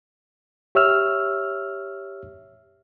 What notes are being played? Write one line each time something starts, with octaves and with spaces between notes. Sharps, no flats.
G4 C#5 E5 E6 F6